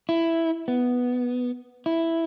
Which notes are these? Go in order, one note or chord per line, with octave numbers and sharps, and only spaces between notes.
E4
B3
E4